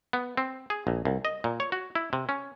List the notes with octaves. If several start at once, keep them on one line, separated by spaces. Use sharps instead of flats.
B3
C4
G#4
A#1
C2
D#5
A#2
C#5
F#4
E4
C3
C#4